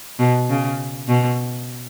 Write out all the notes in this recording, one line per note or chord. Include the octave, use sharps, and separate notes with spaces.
B2
C#3
B2